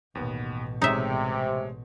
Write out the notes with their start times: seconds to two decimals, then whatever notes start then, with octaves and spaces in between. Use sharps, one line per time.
0.15 A1 D#2 B2 B3
0.82 C3 G#3 A3 D#4 C#5 E5